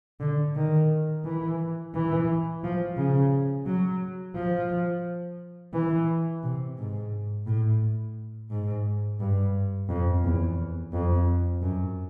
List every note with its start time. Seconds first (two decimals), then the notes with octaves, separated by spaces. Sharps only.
0.20 D3
0.56 D#3
1.24 E3
1.94 E3
2.63 F3
2.97 C#3
3.67 F#3
4.35 F3
5.74 E3
6.43 C3
6.78 G#2
7.47 A2
8.50 G#2
9.19 G2
9.89 F2
10.24 E2
10.93 F2
11.62 F#2